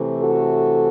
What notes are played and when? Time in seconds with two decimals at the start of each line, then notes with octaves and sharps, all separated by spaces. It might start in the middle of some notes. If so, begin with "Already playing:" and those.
Already playing: C3 E3 A3
0.21 F#4 A4